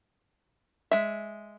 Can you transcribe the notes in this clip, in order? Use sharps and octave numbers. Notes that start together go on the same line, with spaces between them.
G#3 E5